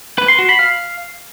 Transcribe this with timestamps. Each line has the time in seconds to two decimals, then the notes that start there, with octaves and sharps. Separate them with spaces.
0.18 B4
0.28 C6
0.39 F#4
0.49 B5
0.59 F5